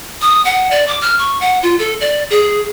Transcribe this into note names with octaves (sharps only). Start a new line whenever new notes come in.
D#6
F#5
D5
D6
F6
C#6
F#5
F4
A4
D5
G#4